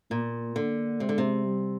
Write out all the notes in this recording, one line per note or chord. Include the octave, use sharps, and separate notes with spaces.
A#2 A#3
D3 A#3
C3 G#3
D3
C3
G3